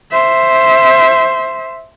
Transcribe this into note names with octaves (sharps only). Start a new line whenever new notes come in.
C5 E5